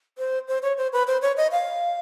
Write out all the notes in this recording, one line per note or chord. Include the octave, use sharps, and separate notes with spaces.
C5
C5
C#5
C5
B4
C5
C#5
D#5
F5